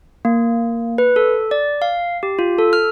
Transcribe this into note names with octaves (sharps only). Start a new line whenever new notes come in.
A#3
B4
A4
D5
F5
G4
F4
A4
F6